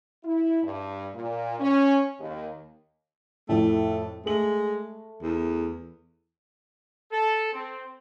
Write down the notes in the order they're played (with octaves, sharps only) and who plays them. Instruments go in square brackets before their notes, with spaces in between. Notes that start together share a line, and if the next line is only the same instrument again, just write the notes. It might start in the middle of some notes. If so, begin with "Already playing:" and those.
[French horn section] E4
G2
A#2
C#4
D#2
[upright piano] F2 A2 [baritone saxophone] A3
[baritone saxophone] G#3 [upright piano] A3 F#7
[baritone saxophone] E2
[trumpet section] A4
C4